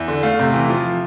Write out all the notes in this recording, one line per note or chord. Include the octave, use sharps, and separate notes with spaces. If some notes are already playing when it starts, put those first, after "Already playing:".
Already playing: E2 E5
D3
A3 F5
C3
E3
F3